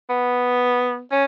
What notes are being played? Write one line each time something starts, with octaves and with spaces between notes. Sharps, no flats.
B3
C#4